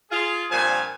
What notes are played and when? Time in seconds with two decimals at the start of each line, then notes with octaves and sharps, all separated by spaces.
0.11 F4 G#4
0.51 G2 A#2 F3 C4 G#5